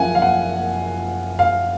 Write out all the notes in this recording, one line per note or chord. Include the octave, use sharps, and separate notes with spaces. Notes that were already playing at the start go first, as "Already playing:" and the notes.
Already playing: F#1 F#2 F3 F5 F#5 G#5
F5
F#5
F5